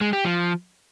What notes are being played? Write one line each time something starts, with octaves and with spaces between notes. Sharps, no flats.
G#3
G4
F3